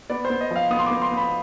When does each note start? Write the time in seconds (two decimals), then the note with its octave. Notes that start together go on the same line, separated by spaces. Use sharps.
0.10 B3 D5
0.25 C5
0.30 B3
0.41 D#5
0.51 F3 F5
0.71 B3 D#6
0.79 C6
0.86 D6
0.91 B3
1.02 C6
1.12 B3
1.17 B5